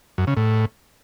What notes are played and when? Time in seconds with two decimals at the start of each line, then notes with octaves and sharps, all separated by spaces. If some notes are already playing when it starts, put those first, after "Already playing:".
0.18 F#2
0.27 C#3
0.37 A2